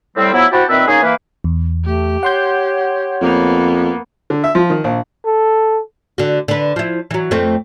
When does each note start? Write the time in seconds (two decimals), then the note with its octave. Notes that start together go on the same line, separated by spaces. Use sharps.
0.16 A2 G3 C4
0.33 F3 F#3 B3 E4
0.52 C4 E4 F#4 G4 F#5 A5
0.69 A#2 D#3 C4 B4 E5
0.87 A#3 C#4 D#4 G#4
1.03 E3 A#3 B4
1.44 E2
1.85 A3 G4
2.23 C#5 F#5 C6 G6
3.21 F2 A#3 B3
4.30 D3
4.44 E5
4.55 F3
4.70 D#3
4.84 A#1
5.25 A4
6.18 D3 F#4
6.48 D3 B4
6.76 F3 E4
7.11 E3 F#3
7.31 F2 A3 C4